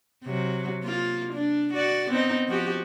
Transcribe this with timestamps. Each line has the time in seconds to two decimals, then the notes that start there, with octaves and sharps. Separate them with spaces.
0.24 C3 F#3
0.84 A#3 F4
1.33 D4
1.74 F#4 D5
2.10 B3 C4 D#4
2.48 F3 F#4 G4